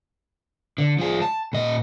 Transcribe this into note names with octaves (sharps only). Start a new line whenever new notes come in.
D3
F3 G#4
A5
A#2 D#5